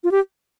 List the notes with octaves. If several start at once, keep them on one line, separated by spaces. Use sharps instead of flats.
F4
G4